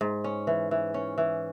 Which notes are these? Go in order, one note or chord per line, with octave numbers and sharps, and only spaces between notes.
G#2
C#4
E3
E3
C#4
E3